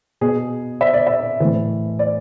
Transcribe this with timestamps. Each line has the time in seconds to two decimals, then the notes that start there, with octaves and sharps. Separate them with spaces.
0.21 B2 G#4
0.81 E5
0.94 D5
1.07 E5
1.40 A2 E3
1.99 D5